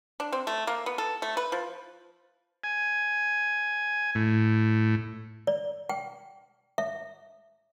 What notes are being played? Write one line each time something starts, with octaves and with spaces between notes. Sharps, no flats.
D4
C4
A3
A#3
B3
A4
A3
B4
F3
G#5
A2
D5
G5
E5